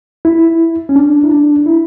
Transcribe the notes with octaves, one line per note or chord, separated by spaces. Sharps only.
E4
C#4
D4
E4
D4
E4